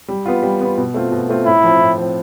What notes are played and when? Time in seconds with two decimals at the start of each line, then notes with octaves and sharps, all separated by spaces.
0.08 G3
0.26 B3 F4
0.43 G3
0.61 B3 F4
0.77 B2
0.94 A3 C4 F4
1.12 B2
1.29 A3 C4 F4
1.46 A2 E4
1.64 F3 C4
1.80 A2
1.97 F3 C4